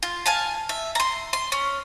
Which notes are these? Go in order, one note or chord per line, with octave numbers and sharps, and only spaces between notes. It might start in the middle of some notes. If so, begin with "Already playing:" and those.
F4
F5 G#5 A5
E5
A#5 C6
C6
C#4